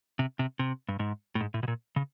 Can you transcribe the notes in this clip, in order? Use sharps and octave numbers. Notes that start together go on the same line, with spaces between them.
C3
C3
C3
G2
G#2
A2
G#2
A2
B2
A#2
C#3